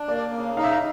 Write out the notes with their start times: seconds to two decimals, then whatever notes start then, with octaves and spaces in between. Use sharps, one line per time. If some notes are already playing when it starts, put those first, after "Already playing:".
Already playing: D4
0.08 A#3 D5
0.33 C#3
0.57 D#4 F5
0.64 E5
0.71 F5